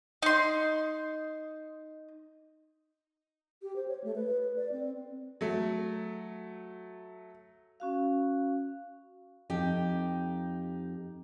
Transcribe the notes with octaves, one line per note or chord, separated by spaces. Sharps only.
D#4 C6
G4
C5
C#5
A3
B4
B4
D5
C4
F#3 A3
C#4 F#4 F5
F2 D#4 G4